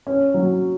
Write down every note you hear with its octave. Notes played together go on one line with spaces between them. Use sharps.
C#4
F#3